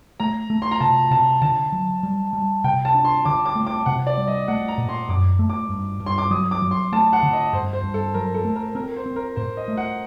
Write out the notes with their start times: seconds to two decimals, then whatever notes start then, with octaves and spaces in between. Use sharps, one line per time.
0.20 A3 A#5
0.50 A3
0.62 C6
0.71 A#5
0.80 C3 A5
1.11 C3 A5
1.42 D3 A5
1.72 F#3
2.03 G3
2.33 G3
2.64 C3 G5
2.85 A5
2.95 D4
3.04 C6
3.25 D3 D6
3.46 D6
3.55 A3
3.67 D6
3.86 C3 F#5
4.07 D5
4.18 G3
4.27 D#5
4.48 A3 F#5
4.68 A#5
4.78 A#2
4.89 C6
5.08 F#2 D6
5.39 A3
5.50 D6
5.69 G2
6.00 G2
6.06 C6
6.18 D6
6.31 F#3 D#6
6.51 D6
6.62 F#3
6.71 C6
6.92 A3 A5
7.13 F#5
7.23 D3
7.33 D#5
7.53 G2 C5
7.73 C5
7.84 G2
7.94 A4
8.14 F#3 A#4
8.34 A4
8.45 A3
8.56 A#4
8.75 C4 A#4
8.96 C5
9.06 C4
9.16 A#4
9.36 A2 C5
9.57 D#5
9.68 A3
9.77 F#5